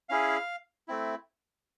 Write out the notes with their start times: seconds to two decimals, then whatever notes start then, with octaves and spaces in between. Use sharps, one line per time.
0.09 C#4 E4 G#4 F5
0.88 A3 C4 E4